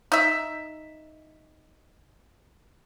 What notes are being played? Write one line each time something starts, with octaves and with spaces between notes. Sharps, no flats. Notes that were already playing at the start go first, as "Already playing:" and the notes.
D#4 E5